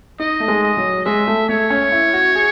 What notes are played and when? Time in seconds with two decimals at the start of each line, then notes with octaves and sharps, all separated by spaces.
0.20 D#4 D#5
0.40 A3
0.48 G#3
0.63 D#5
0.77 F#3
1.05 G#3 E5
1.27 A3
1.49 A3 C#5
1.70 C#4
1.92 E4
2.13 F#4
2.35 G#4